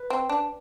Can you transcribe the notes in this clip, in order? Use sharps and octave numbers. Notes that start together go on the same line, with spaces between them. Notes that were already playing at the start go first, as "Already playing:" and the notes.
Already playing: B4
C4
D4